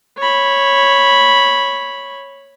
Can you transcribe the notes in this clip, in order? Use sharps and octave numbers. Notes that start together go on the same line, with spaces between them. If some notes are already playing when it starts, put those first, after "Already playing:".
C#5 B5